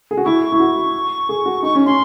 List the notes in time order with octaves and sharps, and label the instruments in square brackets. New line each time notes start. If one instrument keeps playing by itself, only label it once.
[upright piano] G#4
F#4
[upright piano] E4 [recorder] C#6
[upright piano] E4
F#4
G#4
F#4
[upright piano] D#4 [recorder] C#6
[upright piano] C#4
[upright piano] C#4 [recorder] C6